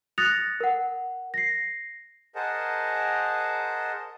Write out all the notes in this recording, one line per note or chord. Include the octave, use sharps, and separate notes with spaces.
D#6 F#6 A6 A#6 C#7 F7
A#4 F#5
A#6 C7
G#4 A#4 C5 D#5 F#5 A5